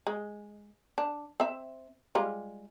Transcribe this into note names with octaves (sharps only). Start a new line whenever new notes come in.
G#3
D4
C4 E5
G3 G#3 F4